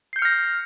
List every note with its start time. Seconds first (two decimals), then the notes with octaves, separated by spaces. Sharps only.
0.13 C7
0.16 G6
0.19 C#7
0.22 F6
0.25 A#6